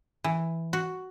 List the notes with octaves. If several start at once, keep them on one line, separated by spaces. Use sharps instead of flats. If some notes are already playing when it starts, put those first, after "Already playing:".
E3
F#4